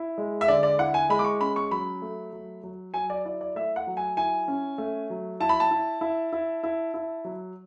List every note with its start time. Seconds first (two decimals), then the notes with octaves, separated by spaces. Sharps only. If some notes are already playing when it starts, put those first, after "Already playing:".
Already playing: E4
0.18 G#3
0.41 E5
0.48 D3 D5
0.63 D5
0.78 E4 F#5
0.94 G#5
1.09 G#3 B5
1.19 D6
1.24 C#6
1.40 C#4 B5
1.56 C#6
1.71 F#3 B5
2.02 A3
2.33 F#3
2.63 F#3
2.94 F#3 G#5
3.10 D5
3.25 E4 D5
3.41 D5
3.55 A3 E5
3.76 F#5
3.87 F#3
3.97 G#5
4.17 E4 G#5
4.48 C#4
4.78 A3
5.10 F#3
5.40 E4 A5
5.49 B5
5.60 A5
5.71 E4
6.01 E4
6.33 E4
6.63 E4
6.94 E4
7.25 F#3